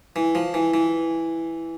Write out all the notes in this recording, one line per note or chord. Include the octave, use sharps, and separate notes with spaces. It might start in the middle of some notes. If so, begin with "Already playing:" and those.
E3
F3
E3
E3